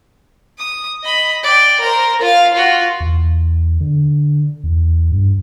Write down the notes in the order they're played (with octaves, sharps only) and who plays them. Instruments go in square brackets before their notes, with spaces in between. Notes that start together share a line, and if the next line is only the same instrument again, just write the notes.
[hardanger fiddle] D#6
D#5 B5
D5 G5
A#4 C5
F4 F5
F4 F#4
[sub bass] E2
D3
E2
G2